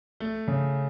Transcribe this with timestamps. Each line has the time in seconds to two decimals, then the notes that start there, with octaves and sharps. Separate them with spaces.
0.20 A3
0.48 C#3